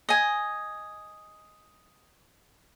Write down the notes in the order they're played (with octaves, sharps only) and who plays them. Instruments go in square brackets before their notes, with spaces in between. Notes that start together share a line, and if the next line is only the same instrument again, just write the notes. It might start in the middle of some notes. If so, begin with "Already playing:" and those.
[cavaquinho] D#5 G#5